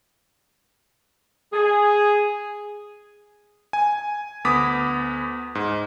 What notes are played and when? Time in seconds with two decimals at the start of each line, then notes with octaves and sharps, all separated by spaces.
1.53 G#4
3.73 G#5
4.45 D2 B3 D6 D#6 B6
5.55 G#2